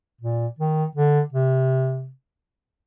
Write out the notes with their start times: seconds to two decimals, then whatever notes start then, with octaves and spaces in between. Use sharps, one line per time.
0.21 A#2
0.59 D#3
0.95 D3
1.33 C3